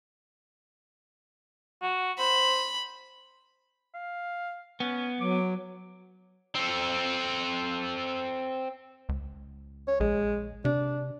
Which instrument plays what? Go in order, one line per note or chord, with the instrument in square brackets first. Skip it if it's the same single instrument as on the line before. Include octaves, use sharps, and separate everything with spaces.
[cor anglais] F#4
[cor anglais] C5 [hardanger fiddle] B5
[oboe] F5
[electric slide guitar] B3 [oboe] C#4
[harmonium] F#3 [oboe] D6
[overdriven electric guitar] C4 A4
[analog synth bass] C#2
[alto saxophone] C#5
[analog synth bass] A#1 [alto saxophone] G#3
[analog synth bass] C3 [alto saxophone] D4